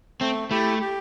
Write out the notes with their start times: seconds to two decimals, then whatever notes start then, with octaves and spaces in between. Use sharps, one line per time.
0.21 A3 C4
0.51 A3 E4 G4
0.81 G4